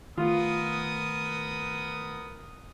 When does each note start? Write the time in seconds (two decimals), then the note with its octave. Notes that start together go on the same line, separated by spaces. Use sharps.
0.18 D#3 A3 B3 F4 A#4 D#6